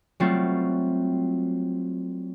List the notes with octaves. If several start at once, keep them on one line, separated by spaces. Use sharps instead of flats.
F#3 G3 A3 C4 F4